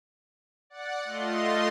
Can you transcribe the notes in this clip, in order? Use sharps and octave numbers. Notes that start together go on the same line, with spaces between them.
D5 F#5
A3 F4 D#5 C6